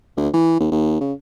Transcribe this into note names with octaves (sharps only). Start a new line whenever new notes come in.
D2
E3
D#2
D#2
C#3